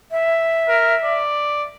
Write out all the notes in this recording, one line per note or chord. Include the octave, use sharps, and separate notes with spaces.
E5
A#4
D5